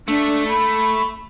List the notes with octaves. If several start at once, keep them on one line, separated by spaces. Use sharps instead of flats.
A3 D4
B5